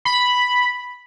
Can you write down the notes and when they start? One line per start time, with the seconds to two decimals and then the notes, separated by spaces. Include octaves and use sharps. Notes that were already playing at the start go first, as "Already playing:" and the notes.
0.05 B5